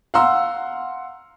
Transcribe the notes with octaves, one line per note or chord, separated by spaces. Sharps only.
F5 F#5 A#5 C6 E6